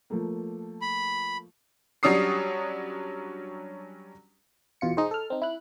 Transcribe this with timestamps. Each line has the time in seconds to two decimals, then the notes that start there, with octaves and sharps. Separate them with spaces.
0.10 F3 A3 A#3
0.82 B5
2.03 F#3 G3 C#4 D4 D#6 C7
4.81 E2 B2 F4 C#7
4.97 D#4 G#4 C5
5.11 A4 F6
5.30 C4 D#4
5.42 E4 F#6